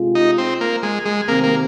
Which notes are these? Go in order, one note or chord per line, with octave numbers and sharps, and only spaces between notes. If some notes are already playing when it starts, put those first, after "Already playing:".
Already playing: C3 G#3 F4
D#4
C4
A#3
G#3
G#3
C3 D#3 A#3 C4
A#3